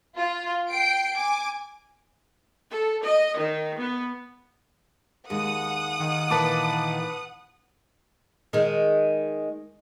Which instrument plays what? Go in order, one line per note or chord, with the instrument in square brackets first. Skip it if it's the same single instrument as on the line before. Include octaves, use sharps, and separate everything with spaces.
[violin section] F4
G5 C7 D7
G#5 D6
[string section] A4
D#5
D#3
B3
[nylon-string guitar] D#2 G#3 [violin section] F#5 D#6
[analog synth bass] D#3
[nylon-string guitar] A#2 E3 [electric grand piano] B4 A5 D6
[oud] D#3 G#3